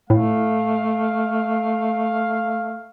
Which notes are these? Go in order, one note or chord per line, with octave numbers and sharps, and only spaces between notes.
A2 A3 F5